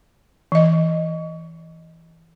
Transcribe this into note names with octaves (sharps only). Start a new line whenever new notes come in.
E3 D#5